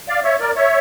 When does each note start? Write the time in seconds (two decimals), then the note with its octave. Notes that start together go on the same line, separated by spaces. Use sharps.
0.09 D5 F5
0.24 C#5 E5
0.40 A#4 D5
0.56 C#5 E5